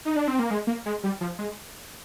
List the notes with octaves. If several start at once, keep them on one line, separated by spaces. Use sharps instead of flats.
D#4
D4
C4
A#3
G#3
A#3
G#3
G3
F3
G#3